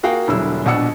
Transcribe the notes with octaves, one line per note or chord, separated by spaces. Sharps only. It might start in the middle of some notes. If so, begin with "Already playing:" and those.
A#3 F#4 G#4 A#4 F5 G5
E1 D3 F#3 G3 E4 E6
A#1 B2 D4 F#5 E6 C#7